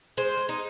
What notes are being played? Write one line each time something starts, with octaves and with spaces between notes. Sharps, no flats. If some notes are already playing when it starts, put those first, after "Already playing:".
G#3 C5
G#3
D#4